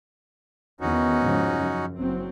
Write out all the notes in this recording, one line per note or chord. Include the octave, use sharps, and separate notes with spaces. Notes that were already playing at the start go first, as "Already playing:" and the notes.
E2 D#3 B3 C#4 D#4 F#4
G#2 C#3 F3
F#2
F#1 F#3 C4